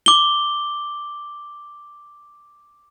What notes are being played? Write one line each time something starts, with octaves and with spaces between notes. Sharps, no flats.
D6 G7